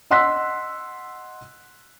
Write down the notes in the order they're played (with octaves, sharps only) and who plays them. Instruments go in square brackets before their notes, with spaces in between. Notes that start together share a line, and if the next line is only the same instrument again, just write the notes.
[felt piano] D#5 F#5 C6 E6 F#6 B6